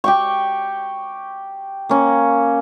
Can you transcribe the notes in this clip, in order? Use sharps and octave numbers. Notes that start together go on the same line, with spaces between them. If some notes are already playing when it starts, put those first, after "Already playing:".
G4 G5 C#6
A#3 C#4